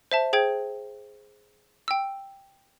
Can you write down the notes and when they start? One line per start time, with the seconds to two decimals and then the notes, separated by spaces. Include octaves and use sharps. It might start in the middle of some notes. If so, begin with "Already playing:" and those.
0.11 C5 E5 A5
0.33 G#4 C5 G5 G#6
1.88 G5 E6